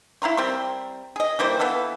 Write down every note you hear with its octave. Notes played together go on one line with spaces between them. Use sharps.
E4 F5 A#5 C6
G3 C4 A#4 C6
G#4 D#5
E3 G3 A#3 C5
E3 B3 A4 F5